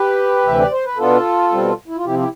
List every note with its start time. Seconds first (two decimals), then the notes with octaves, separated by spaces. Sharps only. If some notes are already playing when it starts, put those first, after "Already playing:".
Already playing: G4 B4
0.44 D2 C3 E3 E5
0.59 D5
0.72 C5
0.85 B4
0.98 B2 B3 D4 F4 A4
1.52 B2 G3 C4
1.88 E4
1.96 F4
2.05 C3 F3 C4 E4 G4
2.19 E4 G4